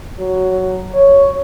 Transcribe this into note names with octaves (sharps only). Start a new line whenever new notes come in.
F#3
C#5